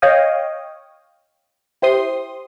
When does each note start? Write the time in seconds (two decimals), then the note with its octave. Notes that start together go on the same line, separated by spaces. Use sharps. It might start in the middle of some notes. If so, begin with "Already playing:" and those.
0.02 C#5 D#5 F5 G5 D#6
1.82 E4 G4 C5 C6 D#6